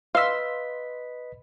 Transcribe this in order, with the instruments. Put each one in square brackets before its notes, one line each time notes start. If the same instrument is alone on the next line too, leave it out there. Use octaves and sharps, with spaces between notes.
[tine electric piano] B4 D#5 B6 [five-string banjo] F5 [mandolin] C6 E6